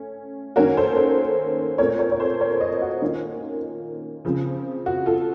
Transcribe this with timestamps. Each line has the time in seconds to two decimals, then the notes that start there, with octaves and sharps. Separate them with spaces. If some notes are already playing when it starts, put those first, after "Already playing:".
Already playing: A3 C#4
0.56 D#3 A#3 C#4 F#4 A#4
0.77 A4 C5
0.97 A4 C5
1.78 A#2 A3 C4 A#4 C#5
1.99 A#4 C#5
2.12 C#5
2.20 A4 C5
2.41 A#4 C#5
2.61 C5 D#5
2.82 F#4
3.02 D#3 A#3 C#4 F4
4.25 C#3 F3 C4
4.86 F#4
5.06 F4 A4